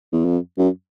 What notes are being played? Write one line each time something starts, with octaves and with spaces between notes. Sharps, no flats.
E2
F2
F#2